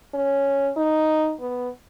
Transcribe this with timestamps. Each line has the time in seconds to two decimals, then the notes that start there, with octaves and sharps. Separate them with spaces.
0.14 C#4
0.77 D#4
1.40 B3